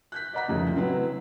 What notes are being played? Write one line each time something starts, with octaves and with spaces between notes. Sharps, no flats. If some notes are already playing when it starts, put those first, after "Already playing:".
F#6 G6 B6
D5 D#5 F#5 A#5 F#6 B6
C2 F2 A2 C#3 F3
F#3 C4 E4 B4